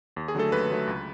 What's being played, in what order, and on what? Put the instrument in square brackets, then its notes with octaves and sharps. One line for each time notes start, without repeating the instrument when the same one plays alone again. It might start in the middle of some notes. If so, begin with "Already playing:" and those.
[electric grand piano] D#2
G#4
D3 F#3 A3 A4
D#2 B4
D3 F#3 A3
C#2